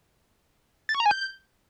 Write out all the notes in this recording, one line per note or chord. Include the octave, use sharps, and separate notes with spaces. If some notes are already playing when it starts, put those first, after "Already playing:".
A6
C#6
A#5
G#5
G6